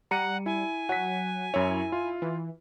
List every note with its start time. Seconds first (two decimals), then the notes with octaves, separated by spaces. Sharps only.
0.11 G3 F#5 A#5 C#7 D#7
0.46 E4 G#5
0.89 F#3 F#5 B6
1.54 F#2 E4 C#5
1.92 F4
2.22 E3